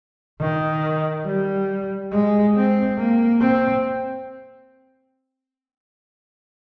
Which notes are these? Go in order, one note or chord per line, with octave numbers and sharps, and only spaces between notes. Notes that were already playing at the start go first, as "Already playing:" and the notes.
D#3
G3
G#3
C4
A#3
C4